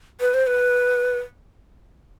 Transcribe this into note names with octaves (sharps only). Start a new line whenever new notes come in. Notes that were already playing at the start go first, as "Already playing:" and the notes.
B4
C5
B4